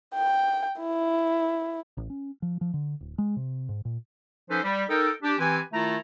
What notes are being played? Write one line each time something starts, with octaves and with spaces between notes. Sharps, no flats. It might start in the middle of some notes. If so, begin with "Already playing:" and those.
G5
E4
A1
C#4
F3
F3
D3
D1
G#3
C3
G#2
A#2
F3 C#4 D#4 A4 B4 C5
G3
D#4 A4 A#4 G5
D4 G4
E3 C4 G4 B4 G#5
D#3 A3 E4 F4 A#5